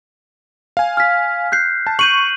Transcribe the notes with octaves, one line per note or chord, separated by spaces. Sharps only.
F5 G#5
F6 B6
F#6 G6 C7
A5
C#6 G6 D#7 F#7